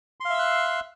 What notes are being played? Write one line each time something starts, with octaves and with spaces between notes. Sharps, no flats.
E5 F5 C6 E6 F#6